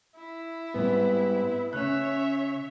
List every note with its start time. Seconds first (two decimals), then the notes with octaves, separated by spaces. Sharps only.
0.16 E4
0.74 G#2 G3 B3 C4
1.73 C#3 C#4 C#5 E5 F#6